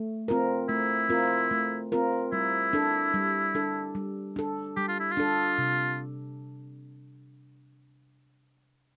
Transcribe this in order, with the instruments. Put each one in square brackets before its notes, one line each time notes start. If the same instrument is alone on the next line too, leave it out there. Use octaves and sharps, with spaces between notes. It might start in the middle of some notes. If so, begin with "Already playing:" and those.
Already playing: [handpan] A3
C4 F4 A#4
[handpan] A3 [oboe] E4
[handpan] C4 F4 A#4
A3
C4 F4 A#4
[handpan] G3 [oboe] E4
[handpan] D4 A4
G3
D4 A4
G3
D4 A4
[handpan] G3 [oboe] G4
[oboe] F4
E4
F4
[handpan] D4 A4
C3